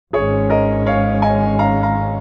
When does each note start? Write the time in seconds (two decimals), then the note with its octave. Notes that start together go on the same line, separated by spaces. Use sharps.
0.13 G#1 G#2 G#3 C#4 G#4 C#5
0.50 A#4 D#5
0.86 C#5 F5
1.22 D#5 G#5
1.59 F5 A#5
1.83 F5 A#5